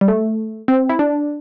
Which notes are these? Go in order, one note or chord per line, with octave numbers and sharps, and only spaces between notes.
G3
A3
C4
E4
D4